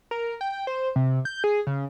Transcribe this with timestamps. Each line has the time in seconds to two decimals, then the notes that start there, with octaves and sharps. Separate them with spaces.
0.11 A#4
0.41 G5
0.67 C5
0.96 C3
1.25 G6
1.44 G#4
1.67 C#3